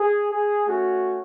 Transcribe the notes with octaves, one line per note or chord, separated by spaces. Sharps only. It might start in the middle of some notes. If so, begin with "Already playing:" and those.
Already playing: G#4
G#4
A3 C#4 F#4